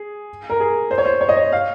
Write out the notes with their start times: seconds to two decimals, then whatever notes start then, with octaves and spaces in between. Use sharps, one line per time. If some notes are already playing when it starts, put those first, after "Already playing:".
Already playing: G#4
0.50 A#4
0.60 G#4
0.91 C5
0.98 C#5
1.05 C5
1.21 C#5
1.29 D#5
1.36 C#5
1.52 F5